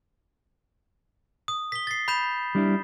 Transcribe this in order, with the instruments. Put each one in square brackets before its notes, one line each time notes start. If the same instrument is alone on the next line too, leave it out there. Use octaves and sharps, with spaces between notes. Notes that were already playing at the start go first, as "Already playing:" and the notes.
[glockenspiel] D#6
B6 G7
A6 C7
B5 G6 E7
[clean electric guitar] G3 D4 E4